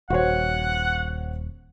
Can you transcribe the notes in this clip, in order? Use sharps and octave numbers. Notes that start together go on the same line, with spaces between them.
D#1 F#4 C5 C#5 F#5